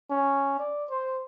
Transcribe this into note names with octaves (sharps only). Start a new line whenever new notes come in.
C#4
D5
C5